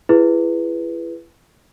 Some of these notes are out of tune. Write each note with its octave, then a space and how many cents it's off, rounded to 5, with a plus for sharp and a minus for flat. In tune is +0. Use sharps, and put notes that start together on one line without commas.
E4 +35 G#4 +0 B4 +0